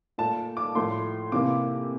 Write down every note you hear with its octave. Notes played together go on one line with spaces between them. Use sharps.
A#2 A3 A5
D6
A2 F3 A3 C6
C3 E3 A#3 D6